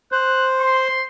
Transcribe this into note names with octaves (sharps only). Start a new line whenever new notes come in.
C5 F#6
C6